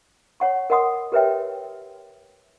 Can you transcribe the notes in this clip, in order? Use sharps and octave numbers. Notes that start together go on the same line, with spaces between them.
C#5 F#5 C#6
A#4 D#5 F#5 C6 D#6
G4 A#4 B4 C#5 E5 G5